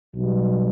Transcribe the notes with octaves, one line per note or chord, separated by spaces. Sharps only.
B1 B2 G3